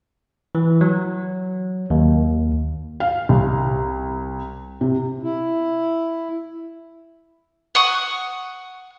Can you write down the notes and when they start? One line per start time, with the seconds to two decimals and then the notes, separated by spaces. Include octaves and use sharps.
0.55 E3
0.81 F#3
1.90 D#2
3.00 F5
3.29 C2
4.81 C3
5.23 E4
7.75 F#5 C#6 D#6